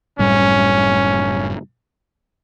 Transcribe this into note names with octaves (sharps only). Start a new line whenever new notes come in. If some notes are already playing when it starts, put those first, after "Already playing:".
F#1 A2 G3 C#4